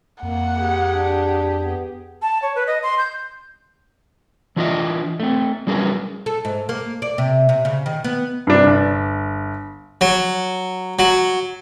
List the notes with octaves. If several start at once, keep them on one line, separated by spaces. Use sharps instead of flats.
F2 A#3 F#5
G4 G#4
D4
B3
A5
C#5
B4
D#5
C6
G6
E3 D4 F4 G4 D#5 E5
A3 C4
F#3 G3 C#4 G#4 A#4 B4
A4
G#2
A#3
D5
C3
C3
C#3
D#3
B3
G2 C3 D4
G1
F#3
F#3